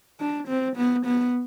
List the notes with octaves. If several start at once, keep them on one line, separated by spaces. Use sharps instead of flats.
D4
C4
B3
B3